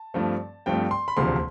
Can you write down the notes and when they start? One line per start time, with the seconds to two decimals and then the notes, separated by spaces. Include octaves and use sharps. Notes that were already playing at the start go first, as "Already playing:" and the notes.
Already playing: A5
0.14 G2 F3 A3 C4
0.66 G2 F3 A3 C4 G5
0.91 C6
1.08 B5
1.17 E1 D2 C3 F3 C6